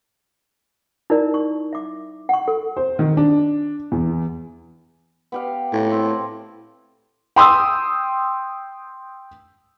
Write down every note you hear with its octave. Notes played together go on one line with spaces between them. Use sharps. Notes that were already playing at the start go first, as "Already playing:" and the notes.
D#4 E4 A#4 D5
C#6
E5 D6
F#5 C#6
A4
C5
D#3
D4
E2
B3 G4 F5
A2
C4
G5 C6 D#6 E6